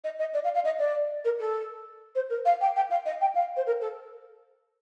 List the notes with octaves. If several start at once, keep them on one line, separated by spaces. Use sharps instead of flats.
D#5
D#5
D5
F5
F5
D#5
D5
A#4
A4
C5
A#4
F5
G5
G5
F5
D#5
G5
F5
C5
A#4
A4